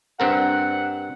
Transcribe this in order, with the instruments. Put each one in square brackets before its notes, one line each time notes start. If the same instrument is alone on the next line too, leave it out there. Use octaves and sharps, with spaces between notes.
[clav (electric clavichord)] G2 C4 A#4 [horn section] F#5